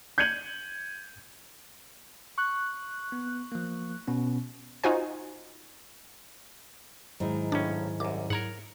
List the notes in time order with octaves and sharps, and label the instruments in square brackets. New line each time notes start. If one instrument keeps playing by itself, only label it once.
[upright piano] G6 G#6 C#7 D#7 F#7
[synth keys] C#6 F#6
[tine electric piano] B3
F3 A#3
B2 B3 C#4
[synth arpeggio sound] D#4 F4 F#4 C5 G#5
[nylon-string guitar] G#2 D#3 [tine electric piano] F#3 E4 G#4
[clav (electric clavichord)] B1 A2 C#4 [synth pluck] D4
[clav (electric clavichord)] C2 F#2 [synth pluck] D6
[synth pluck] G#2 A#5 [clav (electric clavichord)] A#4 C#5 F#5